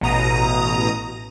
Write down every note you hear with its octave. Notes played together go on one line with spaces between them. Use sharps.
A1 B2 A#5 D#6